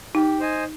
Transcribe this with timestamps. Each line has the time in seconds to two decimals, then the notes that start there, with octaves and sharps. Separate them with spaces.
0.15 D#4 G4
0.40 C5 D#5 G#5